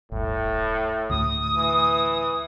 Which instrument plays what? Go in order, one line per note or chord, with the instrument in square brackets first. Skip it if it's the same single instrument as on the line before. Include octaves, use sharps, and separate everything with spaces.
[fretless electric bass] D1 G1 [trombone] A2
[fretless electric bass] D2 A2 [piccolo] D#6
[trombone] E3